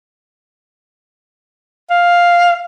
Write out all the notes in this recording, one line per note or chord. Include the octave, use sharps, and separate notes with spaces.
F5